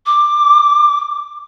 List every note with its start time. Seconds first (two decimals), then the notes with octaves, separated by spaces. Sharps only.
0.06 D6